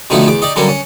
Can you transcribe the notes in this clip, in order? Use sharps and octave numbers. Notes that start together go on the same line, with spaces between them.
B2 D3 D#3 F3 A3 E4
E2 D6
D#4 G4 D5
D3 F#3 G3 A#3 C#4
C#4